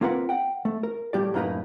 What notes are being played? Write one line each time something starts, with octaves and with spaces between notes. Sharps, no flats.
A#3 C4 F4 A#4 B4 F#5
F#5 G5
A3
A#4
A2 G3 G4 D5
F#2 A2 A#3 D#4 B4 A#5